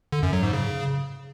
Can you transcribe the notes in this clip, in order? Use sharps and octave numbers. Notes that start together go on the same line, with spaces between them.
D3
F#2
F#3
G#2
C#3